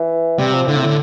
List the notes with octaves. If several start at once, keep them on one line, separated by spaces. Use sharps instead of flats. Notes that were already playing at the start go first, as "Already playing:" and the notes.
Already playing: E3
C3 G3
F3
A2 D3
C3
A2 D3